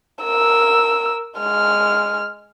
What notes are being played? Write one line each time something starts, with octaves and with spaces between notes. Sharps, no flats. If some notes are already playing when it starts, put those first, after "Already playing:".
A#4 E6
G#3 F6